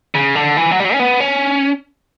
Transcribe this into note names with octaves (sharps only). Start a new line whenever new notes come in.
C#3
D3
E3
F#3
G3
F#3
C#4
B3
C#4